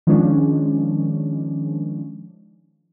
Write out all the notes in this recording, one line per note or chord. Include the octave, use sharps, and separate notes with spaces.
D#3 F3 G#3 C#4 D4